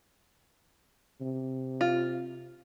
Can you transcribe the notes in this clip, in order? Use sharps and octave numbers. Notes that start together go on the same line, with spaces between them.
C3
F4